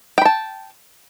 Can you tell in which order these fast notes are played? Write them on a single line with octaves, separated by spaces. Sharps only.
G5 B5 A5